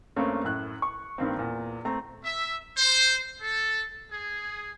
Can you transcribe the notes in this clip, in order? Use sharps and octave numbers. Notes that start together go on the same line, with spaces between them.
G2 A3 A#3 C4 C#4
F#2 A2 F#6
C#6
G2 D#3 A#3 C4
E2 A#2
A3 C4 A#5
E5
C5
A4
G#4